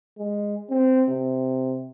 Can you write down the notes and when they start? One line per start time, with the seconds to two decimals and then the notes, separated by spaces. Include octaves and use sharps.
0.18 G#3
0.70 C4
1.09 C3